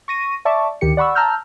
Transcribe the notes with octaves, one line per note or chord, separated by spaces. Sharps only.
C#6 A#6 D#7
D5 E5 A5 C#6 D6
D2 D#3 G4 C#7
D5 F#5 B5 C#6 E6
A5 A#5 E6 F6 G6